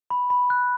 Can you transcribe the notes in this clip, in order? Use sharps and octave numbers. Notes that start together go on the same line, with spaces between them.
B5
B5
F#6